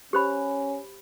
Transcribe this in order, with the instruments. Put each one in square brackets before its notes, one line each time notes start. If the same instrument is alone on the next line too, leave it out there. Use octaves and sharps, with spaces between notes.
[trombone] C#4 [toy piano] G4 C5 B5